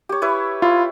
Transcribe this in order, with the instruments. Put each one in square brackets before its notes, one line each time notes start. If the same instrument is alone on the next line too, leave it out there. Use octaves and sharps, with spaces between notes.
[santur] G4 C#5
E4 B4 C#5
[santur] E4 [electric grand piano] F4